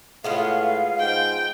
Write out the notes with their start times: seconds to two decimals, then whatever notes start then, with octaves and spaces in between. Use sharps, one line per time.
0.24 A2 G#3 B3 F4 F5
1.00 G#2 G5